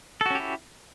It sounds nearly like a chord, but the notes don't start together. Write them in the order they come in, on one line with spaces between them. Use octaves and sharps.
A4 F#4 C#4 G4 E4